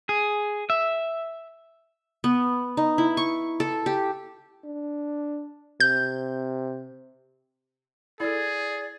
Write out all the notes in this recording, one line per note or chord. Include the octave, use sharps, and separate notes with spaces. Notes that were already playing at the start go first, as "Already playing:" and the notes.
G#4
E5
B3
D#4
E4
C#6
A4
G4
D4
C3 G6
E4 G#4 A4 D5